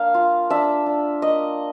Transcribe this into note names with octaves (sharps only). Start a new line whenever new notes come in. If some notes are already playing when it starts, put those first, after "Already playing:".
Already playing: A#3 D4 F5
F4
D4 E5
D4
A#3 D#5